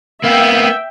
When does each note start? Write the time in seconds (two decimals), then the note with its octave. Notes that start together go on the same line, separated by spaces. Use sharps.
0.24 A#3 B3 E5 G5